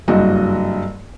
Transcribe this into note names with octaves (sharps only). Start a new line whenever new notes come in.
F#1 G2 F#4 D#5